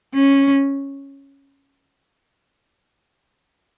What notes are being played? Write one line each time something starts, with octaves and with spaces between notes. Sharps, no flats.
C#4